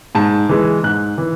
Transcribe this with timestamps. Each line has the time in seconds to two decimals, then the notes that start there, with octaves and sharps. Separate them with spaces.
0.15 G#2 A5
0.49 E3 G#3
0.83 G#2 F#6
1.18 E3